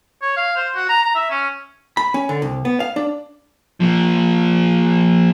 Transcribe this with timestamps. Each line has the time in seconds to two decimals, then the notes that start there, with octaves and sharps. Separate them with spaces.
0.22 C#5
0.37 F5
0.56 C5
0.75 F#4
0.89 A#5
1.03 A#5
1.15 E5
1.30 C#4
1.97 B5
2.14 C#4
2.29 D3
2.42 C2
2.65 B3
2.80 F5
2.96 D4
3.80 A#2 F3